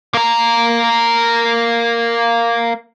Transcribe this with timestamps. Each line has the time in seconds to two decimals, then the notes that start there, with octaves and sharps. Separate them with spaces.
0.14 A#3 A#4